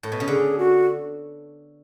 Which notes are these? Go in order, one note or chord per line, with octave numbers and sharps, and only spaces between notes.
A2
B2
C#3
D3 G#4
F#4